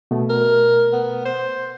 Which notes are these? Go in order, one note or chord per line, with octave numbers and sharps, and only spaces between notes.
B2 A3
A#4
B3
C5